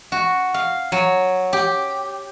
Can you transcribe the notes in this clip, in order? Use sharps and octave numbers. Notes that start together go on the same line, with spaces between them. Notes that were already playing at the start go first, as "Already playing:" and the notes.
F#4
F5
F#3
G4